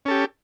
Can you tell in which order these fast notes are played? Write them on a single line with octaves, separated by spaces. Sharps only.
C#4 A4 G4